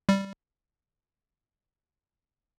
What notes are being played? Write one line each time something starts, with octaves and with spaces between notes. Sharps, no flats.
G3